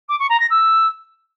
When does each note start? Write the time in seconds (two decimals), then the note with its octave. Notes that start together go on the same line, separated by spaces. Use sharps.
0.08 D6
0.19 C#6
0.29 A#5
0.40 A#6
0.50 E6